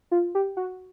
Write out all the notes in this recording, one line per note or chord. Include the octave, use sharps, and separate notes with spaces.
F4
G4
F#4